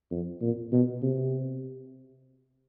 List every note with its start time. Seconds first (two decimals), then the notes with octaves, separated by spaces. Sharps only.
0.11 F2
0.41 A#2
0.72 B2
1.02 C3